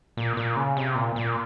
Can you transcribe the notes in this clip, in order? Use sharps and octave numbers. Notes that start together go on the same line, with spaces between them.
A#2
A#2
C#3
C3
A#2
A#2